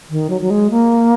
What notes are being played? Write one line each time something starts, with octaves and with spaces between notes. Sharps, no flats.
D#3
F#3
F#3
G#3
A#3